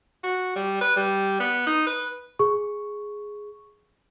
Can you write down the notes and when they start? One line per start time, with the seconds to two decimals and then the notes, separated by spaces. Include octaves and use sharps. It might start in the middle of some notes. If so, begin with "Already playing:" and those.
0.23 F#4
0.55 G3
0.81 B4
0.96 G3
1.40 B3
1.66 D#4
1.86 B4
2.39 G#4 C#6